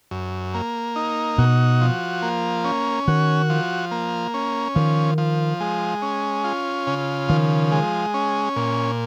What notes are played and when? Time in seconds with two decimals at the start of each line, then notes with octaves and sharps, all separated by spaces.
0.11 F#2
0.54 A#3
0.96 D#4
1.38 B2 F#4
1.81 F3
2.22 A#3
2.65 C#4
3.08 D#3 F#4
3.50 F3
3.91 A#3
4.34 C#4
4.75 D#3 F3
5.18 F3
5.60 G#3
6.02 C#4
6.44 F4
6.87 C#3
7.29 D#3 F3
7.72 G#3
8.14 C#4
8.56 A#2